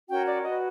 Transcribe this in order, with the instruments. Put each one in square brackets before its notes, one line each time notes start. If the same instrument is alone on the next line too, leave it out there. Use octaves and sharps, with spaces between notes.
[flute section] C#4 F#4 A#4 C#5 G5
D5
F#4 B4 D#5